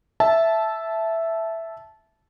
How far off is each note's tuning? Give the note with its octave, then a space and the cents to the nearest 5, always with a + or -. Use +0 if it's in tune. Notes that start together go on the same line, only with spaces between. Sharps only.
E5 +0 A5 -15